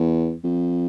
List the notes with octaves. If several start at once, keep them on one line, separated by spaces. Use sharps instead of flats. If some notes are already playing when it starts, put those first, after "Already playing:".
Already playing: E2
F2